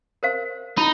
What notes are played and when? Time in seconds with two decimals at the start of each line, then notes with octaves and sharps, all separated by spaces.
0.23 A#4 C5 F5
0.77 D#4 E4 B5